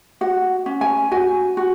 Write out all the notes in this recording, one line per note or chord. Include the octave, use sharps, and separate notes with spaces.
F#4 F#5
C#4
G#5
F#4 G#5
F#4